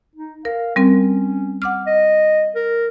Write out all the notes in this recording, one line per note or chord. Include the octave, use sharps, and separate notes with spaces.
D#4
A#4 F5
G3 C4 C#4 A#4
F#5 D6 F6
D#5
A#4